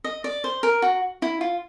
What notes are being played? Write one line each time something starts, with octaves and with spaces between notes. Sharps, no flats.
D#5
D5
C5
A#4
F#4
E4
F4